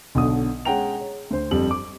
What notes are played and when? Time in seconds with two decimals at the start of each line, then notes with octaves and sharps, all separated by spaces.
0.15 B1 B2 D3 D#6
0.65 G#3 C#4 F#5 G5 A#5 F7
1.00 C#5
1.30 D2 C5
1.51 G1 F2 G3 F#7
1.71 D6